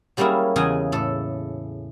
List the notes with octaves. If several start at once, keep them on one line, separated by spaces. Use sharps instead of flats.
F#3 G3 A#3 C#4 E4 G#4
E2 C#3 G#4 D#5 G#5
A2 A4